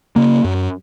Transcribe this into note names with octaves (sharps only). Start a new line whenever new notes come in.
C#3 A#3
F#2